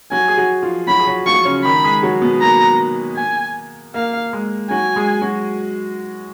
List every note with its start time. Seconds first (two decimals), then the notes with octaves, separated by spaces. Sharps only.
0.12 F#3 F#4 G#5
0.28 G#4
0.37 F#3 F#4
0.63 F3 F4
0.88 F#3 F#4 B5
0.99 G#4
1.07 F#3 F#4
1.26 F3 F4 C#6
1.45 C#3 C#4
1.64 D#3 D#4 B5
1.84 G#3 G#4
2.03 F#3 F#4
2.22 B2 B3
2.41 A#3 A#5
3.17 G#5
3.94 A#3 F5
4.33 G#3
4.70 F#3 F#4 G#5
4.96 G#3 G#4
5.21 F#3 F#4